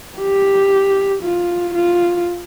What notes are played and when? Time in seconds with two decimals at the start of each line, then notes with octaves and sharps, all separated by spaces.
0.19 G4
1.23 F4
1.75 F4